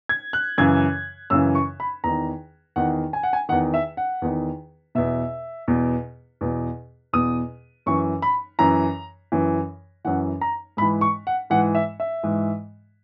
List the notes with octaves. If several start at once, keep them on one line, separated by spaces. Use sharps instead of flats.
G#6
F#6
F#2 C#3 E3 G#6
F#2 C#3 E3 E6
C#6
B5
E2 D#3 A#5
E2 D#3 F#5
G#5
F#5
G#5
E2 D#3 F#5
E5
F#5
E2 D#3
E2 B2 E5
E2 B2
E2 B2
E2 B2 D#6
F#2 E3 C#6
B5
F#2 E3 A#5
F#2 E3
F#2 E3 F#5
A#5
G#2 E3 B5
C#6
F#5
G#2 E3 F#5
E5
E5
G#2 E3